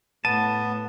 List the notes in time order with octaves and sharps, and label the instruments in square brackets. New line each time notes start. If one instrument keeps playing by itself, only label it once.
[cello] A2 [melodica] B3 [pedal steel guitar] A5 [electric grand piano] D#7